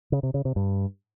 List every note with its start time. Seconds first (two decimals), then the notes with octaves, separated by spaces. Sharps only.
0.12 C#3
0.23 C3
0.34 C#3
0.45 C3
0.56 G2